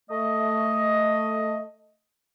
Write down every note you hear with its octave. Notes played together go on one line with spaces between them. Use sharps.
A3 D#5